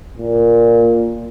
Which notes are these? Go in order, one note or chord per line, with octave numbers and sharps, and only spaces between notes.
A#2